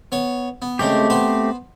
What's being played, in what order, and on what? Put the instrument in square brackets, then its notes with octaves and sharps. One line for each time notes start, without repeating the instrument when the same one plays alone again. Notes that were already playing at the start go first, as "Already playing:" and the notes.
[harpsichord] B3 C#5
B3
[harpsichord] C#3 G#3 G5 [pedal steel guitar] A3 C4 G4
[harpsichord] B3 B4 C5